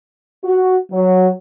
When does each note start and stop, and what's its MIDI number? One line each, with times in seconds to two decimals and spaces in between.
0.44 0.76 66
0.92 1.28 54